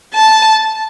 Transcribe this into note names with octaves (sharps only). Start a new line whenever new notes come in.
A5